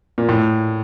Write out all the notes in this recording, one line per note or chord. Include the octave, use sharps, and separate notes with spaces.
A#2
A2